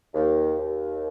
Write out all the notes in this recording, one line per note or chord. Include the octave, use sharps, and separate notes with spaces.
D#2
D#2